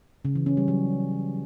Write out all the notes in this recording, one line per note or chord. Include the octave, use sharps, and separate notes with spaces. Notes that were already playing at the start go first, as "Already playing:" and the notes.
C#3
E3
C#4
G3
F#3